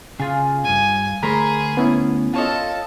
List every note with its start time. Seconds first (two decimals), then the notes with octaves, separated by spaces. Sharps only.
0.20 C#3 F4 G#4
0.64 C2 G2 G#5
1.23 D2 A3 G#4 A#4 C5 B5
1.77 B3 C#4 E4
2.34 F4 A4 C#5 D#5 A5